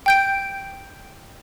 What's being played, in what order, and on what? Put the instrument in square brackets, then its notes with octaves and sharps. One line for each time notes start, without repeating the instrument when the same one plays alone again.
[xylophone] G5 G6 D7